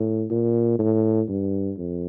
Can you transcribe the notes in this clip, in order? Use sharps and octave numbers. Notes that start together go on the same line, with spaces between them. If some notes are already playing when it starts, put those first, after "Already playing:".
Already playing: A2
A#2
A2
G2
F2